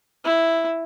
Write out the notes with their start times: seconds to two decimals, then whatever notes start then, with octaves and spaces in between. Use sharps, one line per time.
0.25 E4